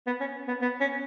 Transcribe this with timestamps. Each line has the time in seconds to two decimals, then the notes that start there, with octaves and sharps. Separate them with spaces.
0.06 B3
0.20 C#4
0.48 B3
0.62 B3
0.80 C#4